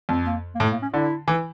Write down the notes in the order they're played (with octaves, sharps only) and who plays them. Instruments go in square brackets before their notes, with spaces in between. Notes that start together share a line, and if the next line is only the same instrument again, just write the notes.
[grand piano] F2
[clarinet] A#3
A#3
[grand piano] A2 [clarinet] A3
[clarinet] A#3
C#4
[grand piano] D3 [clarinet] E4
[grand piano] E3